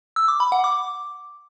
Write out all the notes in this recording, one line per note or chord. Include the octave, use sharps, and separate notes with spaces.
E6
D6
B5
F#5
D6